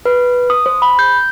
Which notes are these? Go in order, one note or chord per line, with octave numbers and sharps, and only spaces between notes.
B4
D#6
C5
B5
G6